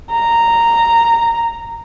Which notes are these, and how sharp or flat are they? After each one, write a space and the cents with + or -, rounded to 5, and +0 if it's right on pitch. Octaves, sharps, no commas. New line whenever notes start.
A#5 -10